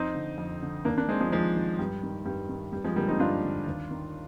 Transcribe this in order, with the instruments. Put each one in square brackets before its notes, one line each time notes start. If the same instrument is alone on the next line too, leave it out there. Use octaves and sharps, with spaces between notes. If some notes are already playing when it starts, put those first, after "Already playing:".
Already playing: [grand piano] F2 C4 D#4
D3
F2
D3
D#2 A#3 D4
A#3 D4
D#3 G#3 C4
F3 G#3
D#2 F3 G#3
D#3
G2 G3
D#3
G2 G3
D#3
G2 G3
F3 G#3
D3 G3 A#3
C4 D#4
G2 D4 F4
D3
D#2
D#3